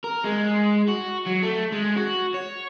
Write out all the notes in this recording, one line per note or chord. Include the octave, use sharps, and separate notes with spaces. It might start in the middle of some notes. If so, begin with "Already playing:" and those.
A#4
G#3
F#4
F#3
A3
G#3
F#4
C#5